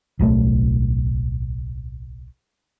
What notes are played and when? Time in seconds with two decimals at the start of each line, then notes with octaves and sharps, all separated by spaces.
0.19 D1 B1 A3